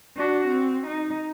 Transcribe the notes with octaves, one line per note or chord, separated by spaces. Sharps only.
D4 F#4
C4
D#4